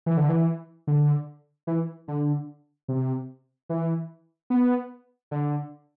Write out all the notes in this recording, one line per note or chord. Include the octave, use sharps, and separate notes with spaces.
E3
D3
E3
D3
E3
D3
C3
E3
B3
D3